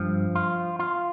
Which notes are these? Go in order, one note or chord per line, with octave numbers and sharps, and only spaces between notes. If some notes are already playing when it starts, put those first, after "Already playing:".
Already playing: G2 F3
F4
F4